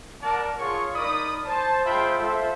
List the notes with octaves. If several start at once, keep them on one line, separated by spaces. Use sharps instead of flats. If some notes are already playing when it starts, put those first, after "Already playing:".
A#4 D5 F#5 A5
F4 G#4 C#5 C#6
D#4 A#4 D5 B5 D#6
C5 A5
G#3 F4 C5 E5 G5 B5
F4 A4 C5 E5